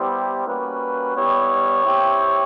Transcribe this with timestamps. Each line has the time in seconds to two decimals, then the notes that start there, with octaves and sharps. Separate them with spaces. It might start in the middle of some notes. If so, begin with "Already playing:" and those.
Already playing: G3 B3 E4 G4 C5
0.46 G3 A#3 C#4 F#4 B4
1.15 G3 B3 E4 G4 C#5
1.84 C4 E4 G4